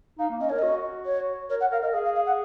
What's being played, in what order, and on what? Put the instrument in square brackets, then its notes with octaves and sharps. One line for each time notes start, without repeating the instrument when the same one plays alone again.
[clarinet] D#4 [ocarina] F5
[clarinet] A#3
[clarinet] C#4 [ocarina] D#5
[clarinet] A#4 [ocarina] C#5
[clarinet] F#4 [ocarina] D#5
[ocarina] C#5
[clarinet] A#4 [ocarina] C#5
[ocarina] F#5
[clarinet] A#4 [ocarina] F5
[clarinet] A#4 [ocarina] D#5
[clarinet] G#4 [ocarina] F5
[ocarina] F5
F5
F#5